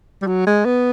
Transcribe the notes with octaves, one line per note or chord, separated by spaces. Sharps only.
G3
F#3
G#3
B3